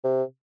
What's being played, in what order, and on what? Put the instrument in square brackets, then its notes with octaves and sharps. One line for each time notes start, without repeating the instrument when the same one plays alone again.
[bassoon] C3